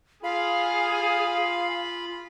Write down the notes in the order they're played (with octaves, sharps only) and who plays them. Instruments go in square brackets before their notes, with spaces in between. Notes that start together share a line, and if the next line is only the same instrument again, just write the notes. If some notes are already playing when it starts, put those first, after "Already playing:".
[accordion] F4 B5 [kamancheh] G#4 [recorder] F5